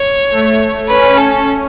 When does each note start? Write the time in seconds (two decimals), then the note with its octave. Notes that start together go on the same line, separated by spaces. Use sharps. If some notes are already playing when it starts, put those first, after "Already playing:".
Already playing: C#5
0.30 A3
0.88 C#4 B4
1.17 A4